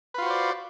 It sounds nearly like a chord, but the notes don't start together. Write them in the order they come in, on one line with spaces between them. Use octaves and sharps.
B4 F4 F#4 C5 D5